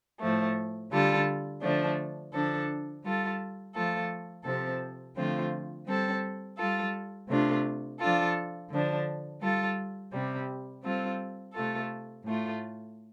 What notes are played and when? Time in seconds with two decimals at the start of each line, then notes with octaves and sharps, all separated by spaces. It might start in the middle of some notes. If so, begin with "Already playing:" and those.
0.20 A2 F3 A3
0.92 D3 G3 F4 A4
1.62 D3 F3 A3 D4
2.33 D3 F3 D4 A4
3.04 G3 F4 A4
3.75 F3 A3 F4 A4
4.45 C3 F3 C4 A4
5.16 D3 F3 A3 C4 F4
5.87 G3 C4 A4
6.58 G3 F4 A4
7.29 C3 A3 D4 F4
8.00 F3 D4 F4 A4
8.70 D3 F3 D4
9.41 G3 F4 A4
10.12 C3 G3 C4
10.83 G3 C4 F4 A4
11.54 C3 A3 F4 A4
12.25 A2 A3 F4